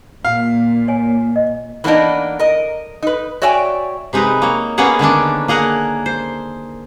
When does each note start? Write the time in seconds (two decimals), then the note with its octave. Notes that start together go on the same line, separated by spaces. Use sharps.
0.25 A#2 F5
0.88 C#5 G#5
1.36 D#5
1.84 E3 A#3 B3 D4 D#4
2.39 A#4 D#5
3.02 D#4 B4
3.42 F#4 C#5 D5 E5 G5 G#5
4.13 C3 G#3 D#4 A#4 B4
4.42 A#3 C#5
4.78 A#3 B3 C#4 G#4 C#5 F#5
4.99 D3 D#3 C#4 D4
5.48 A#3 G#4 A#4 F#5
6.06 C5